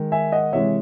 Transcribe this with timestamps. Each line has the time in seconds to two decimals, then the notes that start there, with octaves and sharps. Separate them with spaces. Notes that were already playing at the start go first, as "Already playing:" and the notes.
Already playing: D#3 G#3
0.12 E5 G#5
0.32 D#5 F#5
0.53 C3 E3 G#3 C#5 E5